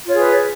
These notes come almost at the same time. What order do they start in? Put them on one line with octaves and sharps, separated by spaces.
F4 C#5 G#4 B4